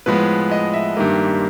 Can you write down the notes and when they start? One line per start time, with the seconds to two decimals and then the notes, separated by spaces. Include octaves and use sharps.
0.06 A2 F3 G#3 B3 B4
0.51 D#5
0.74 E5
0.97 G2 D#3 G3 A#3